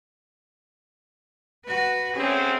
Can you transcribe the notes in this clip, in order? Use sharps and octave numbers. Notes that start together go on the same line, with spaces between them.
F#4 B4
D2 C4 C#4 G#4